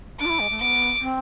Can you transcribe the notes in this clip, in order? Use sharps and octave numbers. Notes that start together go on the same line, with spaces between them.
D4 D6
F4
E4
G#3
A3
B3 D6
C4